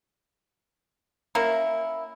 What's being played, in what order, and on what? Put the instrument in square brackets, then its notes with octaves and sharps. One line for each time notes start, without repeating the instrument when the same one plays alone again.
[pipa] A#3 C#4 E4